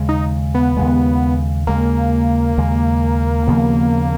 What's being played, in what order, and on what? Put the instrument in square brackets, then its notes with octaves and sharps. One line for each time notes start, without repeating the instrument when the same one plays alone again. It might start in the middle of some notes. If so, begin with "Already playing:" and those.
Already playing: [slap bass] D#2 C#3 G#3
[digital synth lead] D#4
B3
[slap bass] D#2 C#3 G#3
[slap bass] D#2 C#3 G#3 [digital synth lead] A#3
[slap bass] D#2 C#3 G#3
D#2 C#3 F3 B3